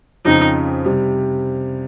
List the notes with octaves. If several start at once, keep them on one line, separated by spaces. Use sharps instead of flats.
F2 C#3 F3 C4 D#4
C3 G3